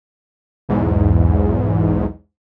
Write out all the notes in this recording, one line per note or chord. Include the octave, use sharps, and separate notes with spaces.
B1 E2 G#2